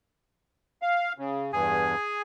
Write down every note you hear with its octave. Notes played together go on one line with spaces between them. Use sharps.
F5
C#3
E2 G2 G#4 G#5